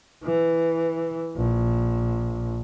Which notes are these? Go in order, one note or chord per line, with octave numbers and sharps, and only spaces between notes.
E3
A#1